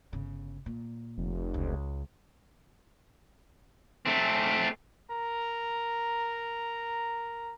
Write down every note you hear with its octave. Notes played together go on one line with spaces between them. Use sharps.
G1 C#3
A#2
F1
C#2
A3 C4
A#4 A#5